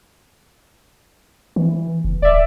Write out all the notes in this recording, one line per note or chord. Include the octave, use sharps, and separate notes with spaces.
E3
F#1
D1 D5 E5